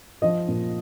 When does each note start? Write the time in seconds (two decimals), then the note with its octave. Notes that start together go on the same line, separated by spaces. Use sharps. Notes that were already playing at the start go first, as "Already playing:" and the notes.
0.22 F3 D#5
0.48 A#2